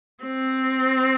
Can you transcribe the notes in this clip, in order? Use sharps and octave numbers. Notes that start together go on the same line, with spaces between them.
C4